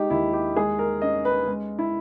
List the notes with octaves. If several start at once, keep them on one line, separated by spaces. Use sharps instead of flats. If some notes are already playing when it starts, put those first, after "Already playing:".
Already playing: G#3 D#4 G4
D#2 E4
G4
G#3 G#4
A#4
C#4 D#5
B4
G#3
E4